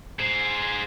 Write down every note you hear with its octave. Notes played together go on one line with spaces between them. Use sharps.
G#4 C5